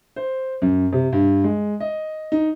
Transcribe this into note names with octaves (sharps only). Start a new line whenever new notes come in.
C5
F#2
C3
G2
G#3
D#5
D#4